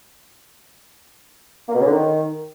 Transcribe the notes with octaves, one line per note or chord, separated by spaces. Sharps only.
A#3
B2
C#3
D3
D#3